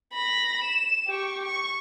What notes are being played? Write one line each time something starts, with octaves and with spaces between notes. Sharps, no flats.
B5 A#6
E7
G4 C#6
C#6